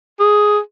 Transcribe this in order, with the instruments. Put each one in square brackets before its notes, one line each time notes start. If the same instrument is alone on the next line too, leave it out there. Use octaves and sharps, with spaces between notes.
[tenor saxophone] G#4